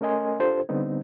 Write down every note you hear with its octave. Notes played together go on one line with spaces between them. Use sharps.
A3 C#4 A#4 D#5 G#5 C6
D4 F4 G4 A4 C5
D3 G3 B3 C4 D#4